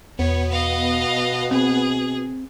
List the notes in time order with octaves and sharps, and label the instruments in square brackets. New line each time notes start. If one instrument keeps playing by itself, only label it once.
[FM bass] E2 [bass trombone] B2 [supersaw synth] B3 [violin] C#5
[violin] D#5 F5
[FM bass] C4 [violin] G#4